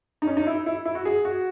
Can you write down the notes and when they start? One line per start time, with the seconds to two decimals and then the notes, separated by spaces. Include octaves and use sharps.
0.22 D#4
0.27 C#4
0.37 D#4
0.47 E4
0.66 E4
0.85 E4
0.95 F#4
1.05 G#4
1.25 F#4